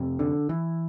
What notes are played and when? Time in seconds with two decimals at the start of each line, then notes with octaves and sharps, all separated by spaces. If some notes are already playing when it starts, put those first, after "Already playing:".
Already playing: F2 C3
0.19 D3
0.49 E3